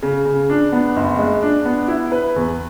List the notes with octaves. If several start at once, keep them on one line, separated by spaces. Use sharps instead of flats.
C#3
C#3
D4
B3
F#1
G#3
D4
B3
E4
B4
E2